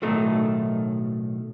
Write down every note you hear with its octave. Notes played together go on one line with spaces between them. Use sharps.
B1 A2 D#3 F#3 A3 D#4